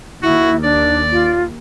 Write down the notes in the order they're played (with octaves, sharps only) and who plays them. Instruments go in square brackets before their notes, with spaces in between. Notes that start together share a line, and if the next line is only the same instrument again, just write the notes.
[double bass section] D#2 [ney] E4 [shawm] F#4
[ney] D4 [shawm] D5
[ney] F4